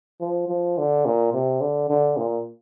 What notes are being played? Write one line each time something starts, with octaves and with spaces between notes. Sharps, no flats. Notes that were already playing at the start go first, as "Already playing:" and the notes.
F3
F3
D3
A#2
C3
D3
D3
A#2